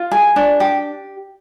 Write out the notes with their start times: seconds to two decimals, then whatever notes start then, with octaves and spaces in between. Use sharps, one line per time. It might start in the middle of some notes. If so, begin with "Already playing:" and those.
Already playing: F4
0.11 G#4
0.36 D4
0.60 G4